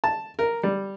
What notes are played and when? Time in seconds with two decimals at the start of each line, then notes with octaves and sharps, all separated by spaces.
0.04 A5
0.39 A#4
0.63 G3